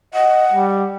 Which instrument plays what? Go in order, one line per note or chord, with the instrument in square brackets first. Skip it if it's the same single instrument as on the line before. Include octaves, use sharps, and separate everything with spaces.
[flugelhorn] D#5 [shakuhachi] F#5
[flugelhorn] G3